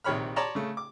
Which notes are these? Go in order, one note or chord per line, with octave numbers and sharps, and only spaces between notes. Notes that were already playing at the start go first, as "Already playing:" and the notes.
A#1 C3 D#3 C#5 B5 F6
C#5 D5 A5 A#5 C6
C#3 A3
D6